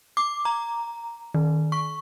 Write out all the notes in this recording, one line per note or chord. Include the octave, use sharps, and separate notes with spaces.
D6
A#5
D#3
C#6